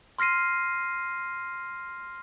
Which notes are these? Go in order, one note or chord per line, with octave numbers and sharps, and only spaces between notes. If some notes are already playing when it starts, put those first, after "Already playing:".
C6 F6 A#6 C7 D#7